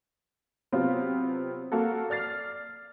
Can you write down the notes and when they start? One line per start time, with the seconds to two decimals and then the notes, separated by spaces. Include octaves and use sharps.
0.72 C3 F#3 B3 C4 F4
1.72 A#3 F#4 A4
2.10 D5 F6 A6 C7